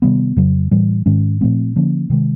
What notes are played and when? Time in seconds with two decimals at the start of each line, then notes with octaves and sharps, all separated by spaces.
0.02 C3 D#3 G3 B3
0.36 F2 C#3 F#3
0.71 A2 E3 G3
1.06 G#2 D#3 G#3 C#4
1.41 A#2 F3 A3 C4
1.76 D3 F3 A#3 C#4
2.10 C3 D#3 G#3